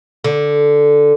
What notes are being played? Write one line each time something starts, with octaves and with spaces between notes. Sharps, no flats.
D3